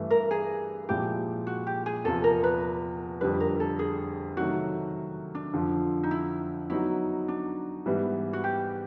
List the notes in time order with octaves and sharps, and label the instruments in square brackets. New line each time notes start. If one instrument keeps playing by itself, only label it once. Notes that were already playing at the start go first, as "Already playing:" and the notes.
Already playing: [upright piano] G2 E3 A3
[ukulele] A#4
G#4
[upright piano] A#2 F3 G#3 C4 E4 [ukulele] G4
[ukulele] F#4
G4
G#4
[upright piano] E2 C3 F3 [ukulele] A4
[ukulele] A#4
B4
[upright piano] F2 D3 G3 [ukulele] B4
[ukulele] A#4
A4
G#4
[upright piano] C3 D#3 F#3 A3 [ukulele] F#4
[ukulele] D4
[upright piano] F2 D3 F3
[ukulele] D#4
E4
[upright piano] F#3 B3 D#4 F#4 [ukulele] E4
[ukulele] D4
[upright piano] G#2 E3 G3 B3
[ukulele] F#4
G4